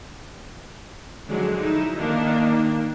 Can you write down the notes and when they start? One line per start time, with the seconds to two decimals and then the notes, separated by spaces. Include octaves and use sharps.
1.28 D3 F3 F#3 G#3
1.61 D#4 E4
1.97 D#3 A#3 D4